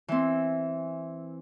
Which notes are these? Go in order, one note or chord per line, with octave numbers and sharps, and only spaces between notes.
E3 C4